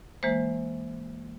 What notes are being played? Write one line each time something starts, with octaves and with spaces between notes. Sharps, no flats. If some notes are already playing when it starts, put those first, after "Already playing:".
E3 G#3 A#3 C5